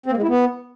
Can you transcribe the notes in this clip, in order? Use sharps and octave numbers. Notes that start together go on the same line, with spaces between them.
C4
A#3
G#3
E4
B3